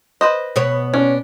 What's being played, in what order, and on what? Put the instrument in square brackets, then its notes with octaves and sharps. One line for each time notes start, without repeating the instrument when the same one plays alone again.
[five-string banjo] B4 C5 D#5
[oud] B2 B3 C#5
[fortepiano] C#4 [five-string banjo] D4